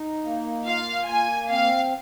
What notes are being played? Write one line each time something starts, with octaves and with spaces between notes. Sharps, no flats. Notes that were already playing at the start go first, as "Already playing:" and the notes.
Already playing: D#4
A#3
F4 F5
A#3 G#5
C4 F5